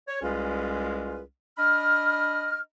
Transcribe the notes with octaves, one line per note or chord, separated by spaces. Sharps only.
C#5
C2 G#3 C#4 F4 G#4 B4
D4 D#5 B5 F6